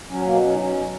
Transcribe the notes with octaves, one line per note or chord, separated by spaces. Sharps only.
F#3 C#4
B2 A#3
F#3 C#4
D#4
B2 C#4
F#3